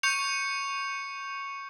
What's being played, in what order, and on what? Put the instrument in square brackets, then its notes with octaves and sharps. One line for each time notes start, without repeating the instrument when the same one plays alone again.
[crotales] C#6 G6 C#7 F7